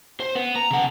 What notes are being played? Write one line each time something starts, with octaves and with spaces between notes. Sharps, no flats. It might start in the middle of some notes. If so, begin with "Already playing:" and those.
C5
B3
A#5
C#3 F#5